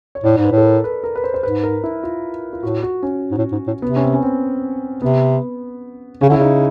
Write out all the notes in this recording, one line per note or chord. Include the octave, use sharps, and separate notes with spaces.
C#5
A2 D5
G#2
B4
A2
A4
A#4
B4
A#4
B4
C5
C5
G#2 B4
A#4
E4
F4
F4
A2 F#4
F#4
C#4
G#2
A2
G#2
A2
C3 B3
C#4
C4
C#4
C4
C3 B3
C#3 C#4
D3
E4
C#3 D#4